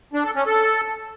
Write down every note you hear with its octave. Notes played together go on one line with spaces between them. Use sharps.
D4
A4
C#4
A4